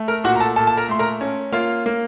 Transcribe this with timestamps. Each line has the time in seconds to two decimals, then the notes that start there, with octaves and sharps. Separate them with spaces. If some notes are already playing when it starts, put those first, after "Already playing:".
Already playing: A3
0.08 A#4 A#5
0.24 A#2 F#4 F#5
0.36 A#5
0.40 A4 A5
0.56 A#2 A4 A5
0.67 A5
0.77 A#4 A#5
0.88 A3 C6
0.99 A#4 A#5
1.21 C#4
1.52 A#3 F4 F5
1.86 A#3